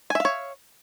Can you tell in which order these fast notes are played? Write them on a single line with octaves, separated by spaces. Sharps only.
G#5 E5 F5 C#5